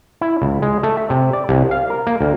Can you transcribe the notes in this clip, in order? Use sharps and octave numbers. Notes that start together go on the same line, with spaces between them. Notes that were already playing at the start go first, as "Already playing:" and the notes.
E4
C#2
G#3
A3
E5
C3
D5
C2
F5
A#4
A#3
D2